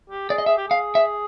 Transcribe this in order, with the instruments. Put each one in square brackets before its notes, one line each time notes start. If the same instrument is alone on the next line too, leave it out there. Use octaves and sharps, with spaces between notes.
[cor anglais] G4
[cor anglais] G#4 [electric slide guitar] D5
[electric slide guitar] D#5
[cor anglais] G#4 [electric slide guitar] E5
[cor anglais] G4
[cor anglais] G#4 [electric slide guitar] F5
[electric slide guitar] E5